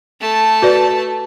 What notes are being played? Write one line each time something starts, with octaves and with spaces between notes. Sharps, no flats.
A3 A5
F#4 B4 D5